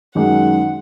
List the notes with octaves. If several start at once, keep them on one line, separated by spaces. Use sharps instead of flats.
F#2 D#3 G#3 F#5